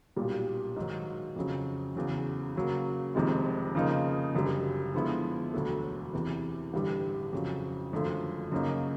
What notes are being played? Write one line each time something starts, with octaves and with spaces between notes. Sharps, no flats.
B1 A#2 G3
G#2 D#3 F#3
F2 C#3 F#3
E2 C#3 F#3
C#3 F#3 A#3
F1 F2 C3 D#3 G#3
C#3 F3 A#3 D#4
F#1 F#2 D3 G3
D3 F3 G#3 B3 E4
E1 D2 D3 F#3 A3
E2 C3 E3
A1 G2 D3 G3
F2 C#3 F#3
G#1 F#2 D3 F3 A3
F#2 C#3 F#3 A#3 D#4